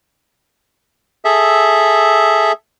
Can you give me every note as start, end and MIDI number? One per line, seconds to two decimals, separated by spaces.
1.25 2.52 68
1.25 2.52 69
1.25 2.52 76